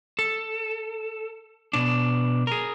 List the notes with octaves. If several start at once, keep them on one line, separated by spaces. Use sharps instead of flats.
A4
B2 D4
G#4 A#4